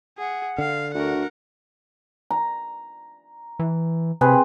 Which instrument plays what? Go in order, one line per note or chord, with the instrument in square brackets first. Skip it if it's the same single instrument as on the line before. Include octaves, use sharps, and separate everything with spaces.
[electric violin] G#4 [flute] F#5
[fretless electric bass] D3 [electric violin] F5
[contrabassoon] D2 [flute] F#4 [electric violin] A#4 F#5
[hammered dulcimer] A#5
[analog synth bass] E3
[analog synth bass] C3 [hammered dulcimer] C4 G#4 B4